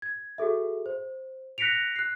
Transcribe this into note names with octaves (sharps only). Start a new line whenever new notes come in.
G#6
F#4 G#4 A4 E5
C5
F#6 A#6 B6 C#7 D7 F7
F#6 C7